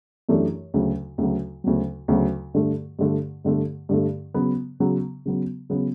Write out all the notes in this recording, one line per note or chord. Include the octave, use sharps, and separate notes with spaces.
F#2 E3 A3 D4 G4
D2 C#3 F#3
D2 C#3 F#3
D2 C#3 F#3
D2 C#3 F#3
G2 D3 A3
G2 D3 A3
G2 D3 A3
G2 D3 A3
C#3 F#3 B3
C#3 F#3 B3
C#3 F#3 B3
C#3 F#3 B3